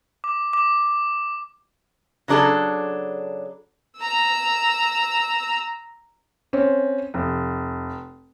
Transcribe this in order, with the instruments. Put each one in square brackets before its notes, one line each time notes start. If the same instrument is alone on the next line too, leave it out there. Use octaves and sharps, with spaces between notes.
[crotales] D6
D6
[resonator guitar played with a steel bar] C#3 F#3 D4 G#4 A4
[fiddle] A#5 E6
[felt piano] C4 C#4
F1